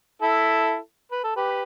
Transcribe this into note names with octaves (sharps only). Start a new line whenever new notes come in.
E4 A4
B4
A4
G4 B4